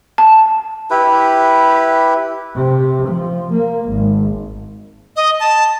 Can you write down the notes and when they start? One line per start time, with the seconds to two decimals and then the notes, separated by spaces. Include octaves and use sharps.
0.18 A5
0.90 E4 G4 B4
2.55 C3
3.08 F3
3.52 A#3
3.90 G#1
5.16 D#5
5.40 A5